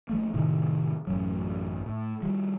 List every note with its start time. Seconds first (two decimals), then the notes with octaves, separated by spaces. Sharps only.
0.09 F3 A3 A#3
0.34 A2 C3 D#3
1.07 A1 F#2 F#3
1.86 A2
2.23 F3 G3